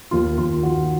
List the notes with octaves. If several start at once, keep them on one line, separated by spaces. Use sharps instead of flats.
D#2 F4
D#2 F4
D#3 F#4